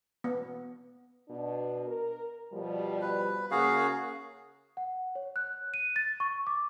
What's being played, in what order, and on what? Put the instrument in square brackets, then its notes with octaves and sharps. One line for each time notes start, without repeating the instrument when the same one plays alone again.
[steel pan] B3
[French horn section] B2 D4
A#4
B2 F3 G3
[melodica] B4
[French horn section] C#3 A#3 [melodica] F#4 G#4 F5
[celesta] F#5
C#5
F#6
D#7
A6
C#6
D6